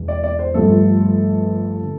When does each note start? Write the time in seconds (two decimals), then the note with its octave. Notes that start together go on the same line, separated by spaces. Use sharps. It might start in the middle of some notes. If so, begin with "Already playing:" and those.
Already playing: E1 E2 B2
0.08 D5
0.24 D5
0.39 C5
0.54 G1 G2 F3 A3 A4
1.82 D3